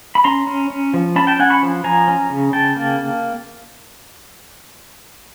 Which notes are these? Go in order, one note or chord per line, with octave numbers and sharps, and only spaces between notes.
B5
C#4 A#5 C6
C#4
C#4
F3
C#4 A5 B5
G5 A5
C#4 F#5 G#5
B5 C#6
F3
F3 G#5 A#5
C#4
C#3
C#3 G5 A5
A#3